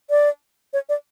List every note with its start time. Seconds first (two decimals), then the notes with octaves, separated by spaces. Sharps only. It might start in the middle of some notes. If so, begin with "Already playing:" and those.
0.10 D5
0.73 C#5
0.89 D5